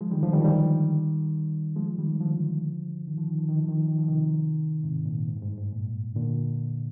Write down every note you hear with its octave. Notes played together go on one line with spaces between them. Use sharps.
F3 G#3
D#3 G3
D3 F3
D#3 G3
F3
D#3 G3
F3 G#3
D#3 G3
D3 F3
D#3
F3
D#3
F3
D#3
F3
D#3
F3
D#3
F3
C3 D#3
G#2 C3
A#2
G#2
G2
G#2
G#2
A#2
A#2 D3